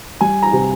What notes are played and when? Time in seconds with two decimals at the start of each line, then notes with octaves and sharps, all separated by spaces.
0.21 G3 G#5
0.42 A#5
0.53 C3